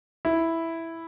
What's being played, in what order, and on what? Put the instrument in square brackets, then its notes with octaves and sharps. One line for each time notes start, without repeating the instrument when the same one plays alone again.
[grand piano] E4